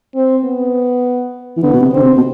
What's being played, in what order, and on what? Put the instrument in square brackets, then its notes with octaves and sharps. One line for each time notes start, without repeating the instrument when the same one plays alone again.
[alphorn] C4
B3
[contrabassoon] E3
[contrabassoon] D3 [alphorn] B3
[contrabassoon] B2
C3
[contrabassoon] D3 [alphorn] C4
[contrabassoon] C3
B2